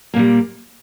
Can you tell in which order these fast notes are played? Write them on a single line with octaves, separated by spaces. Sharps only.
A#3 A#2 G3